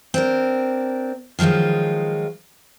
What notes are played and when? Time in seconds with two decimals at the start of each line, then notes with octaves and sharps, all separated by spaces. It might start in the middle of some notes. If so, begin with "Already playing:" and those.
0.14 C4 D4 A#4
1.39 D#3 F3 F#3 G#3 F4